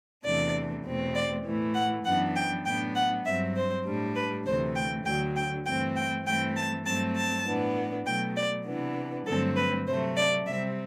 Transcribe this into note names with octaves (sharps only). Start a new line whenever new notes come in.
E2 C3 E3 A3 D4 D5
E2 B2 A3 C4
D5
A2 E3 A3
F#5
F#2 E3 B3 D4 F#5
G5
A2 F#3 B3 D4 G5
F#5
G2 F#3 C4 E5
C5
A2 G3 D4
B4
D2 C3 E3 A3 C5
G5
D2 D3 F#3 G5
G5
G2 E3 A3 C4 G5
G5
G2 E3 A3 C4 G5
A5
G2 F#3 A3 C4 A5
A5
A2 E3 B3 D4
B2 F#3 A3 G5
D5
C3 E3 B3 D4
G2 D3 F#3 A3 C4 A4
B4
C3 F#3 A3 C5
D5
C3 G3 C4 E5